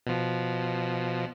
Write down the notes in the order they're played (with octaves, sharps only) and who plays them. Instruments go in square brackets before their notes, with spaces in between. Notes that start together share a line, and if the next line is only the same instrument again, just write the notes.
[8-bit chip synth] B2 F3